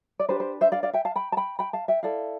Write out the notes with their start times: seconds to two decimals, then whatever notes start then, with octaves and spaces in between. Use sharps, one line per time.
0.19 D5
0.29 D4 G4 B4 C5
0.40 C5
0.61 C5 E5
0.72 D5 F5
0.83 D5 F5
0.93 E5 G5
1.05 F5 A5
1.16 G5 B5
1.32 A5
1.37 G5 B5
1.59 G5 B5
1.73 F5 A5
1.88 E5 G5
2.03 E4 A4 D5 F5